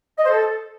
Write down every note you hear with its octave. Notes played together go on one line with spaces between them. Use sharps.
D#5
C5
A4